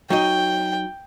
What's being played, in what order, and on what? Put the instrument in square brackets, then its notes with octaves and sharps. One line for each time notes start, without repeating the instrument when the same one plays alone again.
[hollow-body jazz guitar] F#3 D#4 D#5 [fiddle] G5